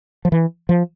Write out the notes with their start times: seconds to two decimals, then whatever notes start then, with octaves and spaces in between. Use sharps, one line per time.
0.25 F3
0.32 E3
0.69 F3